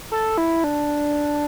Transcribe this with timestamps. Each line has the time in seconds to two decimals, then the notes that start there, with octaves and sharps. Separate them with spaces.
0.12 A4
0.38 E4
0.64 D4